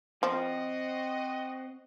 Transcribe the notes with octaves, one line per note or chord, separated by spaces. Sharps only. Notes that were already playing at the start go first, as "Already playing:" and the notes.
F3 C4 F#4 D#5